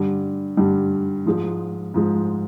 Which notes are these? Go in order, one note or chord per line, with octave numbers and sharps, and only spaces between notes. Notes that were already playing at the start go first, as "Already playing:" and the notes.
Already playing: G2 D3 G3
G2 D3 G3
G#2 F3 G#3
G#2 F3 G#3